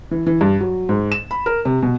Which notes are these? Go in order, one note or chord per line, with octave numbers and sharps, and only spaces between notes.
E3
E3
G2
F#3
G#2
E7
B5
A#4
C3
B2